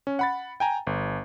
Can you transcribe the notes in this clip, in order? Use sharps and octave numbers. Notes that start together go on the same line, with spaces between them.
C#4
F#5 B5 A6
G5 G#5 A#5
G1